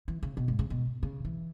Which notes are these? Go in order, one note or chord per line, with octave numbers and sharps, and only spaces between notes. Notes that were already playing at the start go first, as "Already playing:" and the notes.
E3
C#3
B2
G#2
C#3
B2
C#3
E3